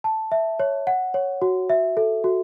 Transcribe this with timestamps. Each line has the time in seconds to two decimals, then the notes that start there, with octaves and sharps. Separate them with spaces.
0.04 A5
0.32 E5
0.60 C#5
0.87 F#5
1.14 C#5
1.42 F#4
1.70 E5
1.97 A4
2.24 F#4